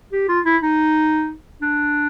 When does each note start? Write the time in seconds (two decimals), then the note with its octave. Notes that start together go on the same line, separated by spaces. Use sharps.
0.12 G4
0.28 F4
0.45 E4
0.62 D#4
1.62 D4